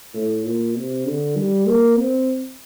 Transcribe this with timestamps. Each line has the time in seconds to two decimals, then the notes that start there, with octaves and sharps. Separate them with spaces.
0.14 A2
0.44 A#2
0.75 C3
1.05 D3
1.36 G3
1.66 A#3
1.96 C4